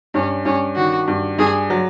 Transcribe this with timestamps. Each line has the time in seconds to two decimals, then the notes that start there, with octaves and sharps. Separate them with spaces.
0.14 G2 C#4
0.45 G2 C#4
0.76 D#3 F#4
1.08 G2
1.39 G2 G#4
1.70 F#3